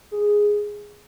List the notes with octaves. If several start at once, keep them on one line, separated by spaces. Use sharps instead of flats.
G#4